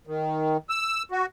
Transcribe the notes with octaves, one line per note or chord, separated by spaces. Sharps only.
D#3
E6
F#4